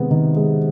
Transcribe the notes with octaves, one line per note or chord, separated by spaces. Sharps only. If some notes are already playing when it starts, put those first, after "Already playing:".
Already playing: C3 D#3 G#3 B3
D#3
G#3